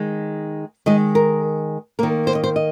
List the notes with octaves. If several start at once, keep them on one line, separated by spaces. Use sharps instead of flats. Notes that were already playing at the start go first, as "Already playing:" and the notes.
Already playing: D#3 G#3
D#3 G#3 D#5
A#4
D#3 A#3 A#4
C5
D#5
C5
D#5